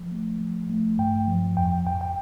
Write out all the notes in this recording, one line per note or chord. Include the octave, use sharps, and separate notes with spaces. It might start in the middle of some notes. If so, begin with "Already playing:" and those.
Already playing: F3
A3
F3
A3
G2 G5
F3
F2 G5
F2 G5
G5